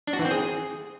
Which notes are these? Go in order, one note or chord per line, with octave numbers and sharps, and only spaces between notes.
D4
F#4
E3
C4
G#4